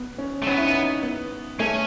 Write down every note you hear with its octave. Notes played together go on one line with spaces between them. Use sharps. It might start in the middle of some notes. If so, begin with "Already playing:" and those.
Already playing: B3
C#4
A3
B3 C#4
E4
D#4
D#4
B3
A3 C#4